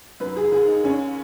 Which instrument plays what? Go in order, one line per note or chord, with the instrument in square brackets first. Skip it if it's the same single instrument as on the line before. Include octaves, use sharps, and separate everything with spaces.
[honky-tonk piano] F#2 D#3 B4
G#4
D#2 D#3 G#4
D#4
D#2 D#3 C#4